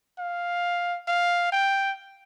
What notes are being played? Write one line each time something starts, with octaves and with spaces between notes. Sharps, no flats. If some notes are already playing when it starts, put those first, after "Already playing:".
F5
F5
G5